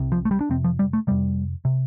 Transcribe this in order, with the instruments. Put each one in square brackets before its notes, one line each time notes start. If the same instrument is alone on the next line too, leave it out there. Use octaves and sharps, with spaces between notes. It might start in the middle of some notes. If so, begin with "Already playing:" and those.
Already playing: [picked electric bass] C2 C3
F3
A3
G3
D4
F2 C3 C4
F3
G3
A3
F2 C3 G3
C3